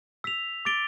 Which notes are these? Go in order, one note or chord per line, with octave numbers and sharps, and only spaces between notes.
E6 B6 F7
D6 A6 D7 G7